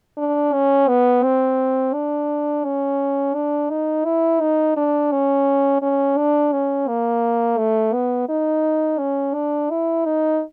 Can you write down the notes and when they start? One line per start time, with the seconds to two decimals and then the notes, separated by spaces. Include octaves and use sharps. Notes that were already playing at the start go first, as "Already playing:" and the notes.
0.18 D4
0.53 C#4
0.88 B3
1.23 C4
1.94 D4
2.64 C#4
3.34 D4
3.70 D#4
4.05 E4
4.41 D#4
4.77 D4
5.12 C#4
5.82 C#4
6.17 D4
6.52 C#4
6.88 A#3
7.58 A3
7.93 B3
8.29 D#4
8.99 C#4
9.34 D4
9.70 E4
10.05 D#4